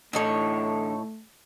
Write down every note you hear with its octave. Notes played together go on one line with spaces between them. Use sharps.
A2 D3 E3 A3 D#4 A4 C#5